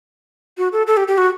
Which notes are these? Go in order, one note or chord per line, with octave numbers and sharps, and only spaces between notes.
F#4
A4
A4
G4
G4
F#4